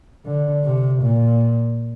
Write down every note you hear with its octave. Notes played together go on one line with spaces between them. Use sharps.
D3
C3
A#2